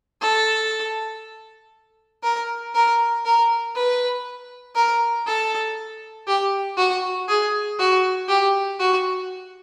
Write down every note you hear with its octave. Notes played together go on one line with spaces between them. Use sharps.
A4
A#4
A#4
A#4
B4
A#4
A4
G4
F#4
G#4
F#4
G4
F#4